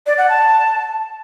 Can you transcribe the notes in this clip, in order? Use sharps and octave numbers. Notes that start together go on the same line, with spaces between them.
D5
F#5
A5